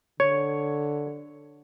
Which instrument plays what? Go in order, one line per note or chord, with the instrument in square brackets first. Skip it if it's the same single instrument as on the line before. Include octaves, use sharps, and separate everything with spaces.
[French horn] D3 [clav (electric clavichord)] C#5